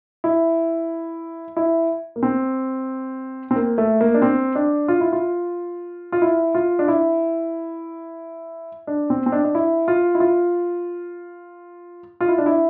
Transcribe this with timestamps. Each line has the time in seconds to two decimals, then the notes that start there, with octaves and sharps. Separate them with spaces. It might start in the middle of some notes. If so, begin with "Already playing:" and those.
0.24 E4
1.57 E4
2.16 A#3
2.23 C4
3.51 C4
3.56 A#3
3.78 A3
4.01 A#3
4.14 D4
4.22 C4
4.55 D4
4.88 F4
5.01 E4
5.13 F4
6.12 F4
6.22 E4
6.55 F4
6.79 D4
6.88 E4
8.87 D4
9.10 C4
9.26 C4
9.32 D4
9.45 D4
9.55 E4
9.88 F4
10.15 E4
10.20 F4
12.20 F4
12.28 E4
12.38 D4
12.46 E4